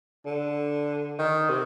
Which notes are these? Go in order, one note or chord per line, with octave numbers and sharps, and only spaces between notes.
D3
D#3
C3